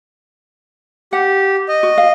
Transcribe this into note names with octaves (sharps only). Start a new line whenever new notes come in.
G4 F#5
D#5
F#4
F5